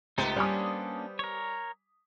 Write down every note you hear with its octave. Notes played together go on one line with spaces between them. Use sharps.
C#2 A3 B3 D#4 G4 C5
G3 A#3 C#4 D4 G#5 D#6
A#4 C#5